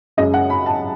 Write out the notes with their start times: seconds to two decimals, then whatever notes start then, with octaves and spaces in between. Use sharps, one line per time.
0.17 F#2 C#3 G#3 C#4 D#5
0.34 F#5
0.50 B5
0.66 A5